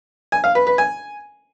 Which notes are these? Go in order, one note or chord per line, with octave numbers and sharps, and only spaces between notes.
G#5
F5
B4
B4
G#5